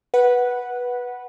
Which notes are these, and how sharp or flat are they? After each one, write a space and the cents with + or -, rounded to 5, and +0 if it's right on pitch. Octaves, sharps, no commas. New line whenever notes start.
B4 -10 F#5 +0